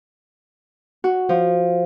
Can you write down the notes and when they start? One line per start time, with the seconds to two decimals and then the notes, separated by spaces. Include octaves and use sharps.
1.04 F#4
1.29 F3